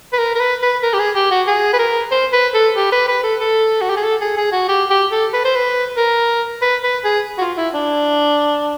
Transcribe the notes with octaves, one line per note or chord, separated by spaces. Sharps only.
B4
A#4
A#4
B4
B4
A#4
G4
G#4
G4
F#4
G#4
B4
A#4
C5
B4
A4
G4
B4
B4
A4
A4
F#4
G4
G#4
A4
G#4
G#4
F#4
G4
G4
A4
B4
C5
B4
A#4
B4
B4
G#4
F#4
F4
E4
D4